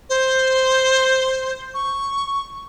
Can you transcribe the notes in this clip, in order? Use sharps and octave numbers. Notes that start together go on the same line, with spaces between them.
C5
C#6